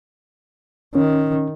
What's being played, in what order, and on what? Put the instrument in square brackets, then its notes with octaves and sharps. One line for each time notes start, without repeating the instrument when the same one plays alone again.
[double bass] D#3 [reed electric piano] C#4